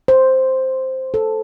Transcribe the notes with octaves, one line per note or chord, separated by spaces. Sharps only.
C5
A4